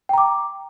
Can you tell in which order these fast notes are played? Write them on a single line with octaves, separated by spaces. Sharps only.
G5 A#5 D6